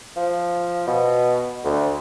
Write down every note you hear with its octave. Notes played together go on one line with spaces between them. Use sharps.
F3
B2
D2